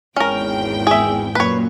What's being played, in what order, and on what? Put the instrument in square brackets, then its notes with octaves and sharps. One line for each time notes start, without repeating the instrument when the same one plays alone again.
[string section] G#1 E2 G5 [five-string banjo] C#4 A#4
[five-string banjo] G#4 E5
[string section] F#2 A#2 [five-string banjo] B4 C#5